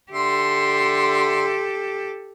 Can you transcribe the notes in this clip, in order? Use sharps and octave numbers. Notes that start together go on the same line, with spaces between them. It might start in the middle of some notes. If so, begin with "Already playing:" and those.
D3 G4 A4 E5 C6